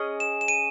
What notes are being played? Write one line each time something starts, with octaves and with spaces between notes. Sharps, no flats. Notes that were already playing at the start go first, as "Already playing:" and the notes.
Already playing: C#4 G#4 D#5
E7
E7
D#7